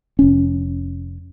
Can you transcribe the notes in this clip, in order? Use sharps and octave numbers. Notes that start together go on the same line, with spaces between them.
F1 C#4